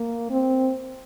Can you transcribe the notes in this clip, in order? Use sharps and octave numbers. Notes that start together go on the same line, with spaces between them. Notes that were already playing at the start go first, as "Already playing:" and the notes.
Already playing: A#3
C4